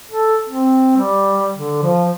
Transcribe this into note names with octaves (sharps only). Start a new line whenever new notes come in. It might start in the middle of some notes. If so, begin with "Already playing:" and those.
A4
C4
G3
D3
F3